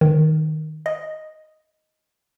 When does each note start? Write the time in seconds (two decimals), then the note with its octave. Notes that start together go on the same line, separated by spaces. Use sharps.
0.01 D#3
0.86 D#5